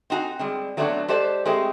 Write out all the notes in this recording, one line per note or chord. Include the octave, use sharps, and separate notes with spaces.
C4 D#4 F#4 G#5
G3 G#3 C4
F#3 A3 B3 C4 D4 F#4
G#3 G4 A4 C5 D5
G#3 A3 C4 G4 D#5